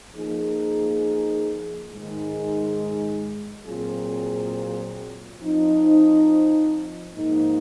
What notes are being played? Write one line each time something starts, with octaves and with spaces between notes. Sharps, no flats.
F3 A#3 D#4 G#4
G#2 D#3 G#3
A#2 F#3 C4 F4 G#4
F3 C4 D#4
G#2 F3 A#3 D#4